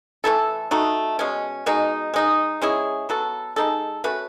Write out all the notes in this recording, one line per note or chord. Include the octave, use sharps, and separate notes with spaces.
E3 A3 E4 A4
A3 D#4 F#4
B2 G#3 C#4
B2 G#3 D#4
G#3 D#4 G#4
G#3 C#4 E4 G#4
F#3 B3 F#4 A4
G#3 D#4 A4
A3 C#4 F#4 B4